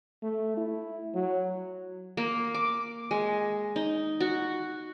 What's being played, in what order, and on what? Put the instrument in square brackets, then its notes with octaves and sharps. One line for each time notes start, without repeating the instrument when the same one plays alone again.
[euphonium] A3
E4
F#3
[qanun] A#3
D6
G#3
D#4
F#4